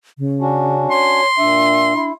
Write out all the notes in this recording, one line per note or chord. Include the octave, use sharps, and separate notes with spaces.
C#3
C#4 D4 F#4
C#5 C6
A#2 D4 E5
E4